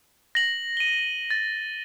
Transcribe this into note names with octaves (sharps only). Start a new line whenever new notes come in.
A#6 F#7
D#7 G7
A6